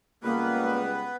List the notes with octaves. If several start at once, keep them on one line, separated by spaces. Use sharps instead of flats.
C#2 G3 A#3 B3 B4